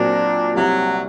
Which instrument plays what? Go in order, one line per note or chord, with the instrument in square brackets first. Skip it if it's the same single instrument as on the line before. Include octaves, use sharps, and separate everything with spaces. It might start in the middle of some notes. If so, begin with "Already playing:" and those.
Already playing: [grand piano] A#2 F#3 C4 F#4 A#4 [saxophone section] D4
[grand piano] C2 C3 G3 [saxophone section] F#3